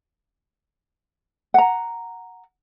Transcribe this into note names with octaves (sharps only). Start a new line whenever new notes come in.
F#5 A#5